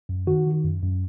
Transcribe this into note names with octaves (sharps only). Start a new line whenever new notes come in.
F#2
D#3 F#4
D#3
F#2
F#2